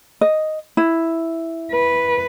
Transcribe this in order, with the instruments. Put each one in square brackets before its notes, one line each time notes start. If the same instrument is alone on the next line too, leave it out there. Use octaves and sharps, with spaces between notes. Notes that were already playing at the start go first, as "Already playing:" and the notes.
[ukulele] D#5
E4
[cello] B4